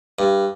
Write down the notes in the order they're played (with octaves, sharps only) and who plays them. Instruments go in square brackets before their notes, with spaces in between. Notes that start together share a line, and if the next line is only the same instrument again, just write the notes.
[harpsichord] G2